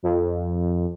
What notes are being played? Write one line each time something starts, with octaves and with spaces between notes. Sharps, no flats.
F2